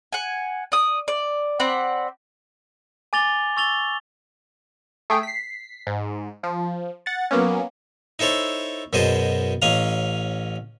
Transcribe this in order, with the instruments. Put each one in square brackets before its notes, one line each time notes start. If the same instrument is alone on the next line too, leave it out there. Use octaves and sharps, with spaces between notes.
[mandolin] F#5 G#5
D5 D#6
D5
C4 D5 F#5 B5
[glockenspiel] G#5 D6 A6 F7 G7
C#6 E6 A6 F7 G7
[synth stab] A3 G#4 G5
B6 C7
G#2
F3
F#5 A6
F#3 A#3 B3 C#4
[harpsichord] D#4 E4 A4 C5 C#5
F#2 B2 G#4 C5 D#5 A5
A1 C#4 D#5 F5 A#5